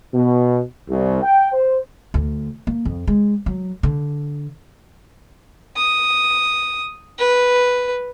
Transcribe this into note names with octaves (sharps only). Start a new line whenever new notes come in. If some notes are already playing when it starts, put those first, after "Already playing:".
B2
C2
G5
C5
D2
A#3
F2
G#3
F#3
D3
D#6
B4